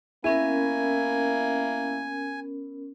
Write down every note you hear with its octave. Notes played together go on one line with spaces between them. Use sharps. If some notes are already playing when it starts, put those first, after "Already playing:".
A#3 B3 C#4 E4 A#4 G#5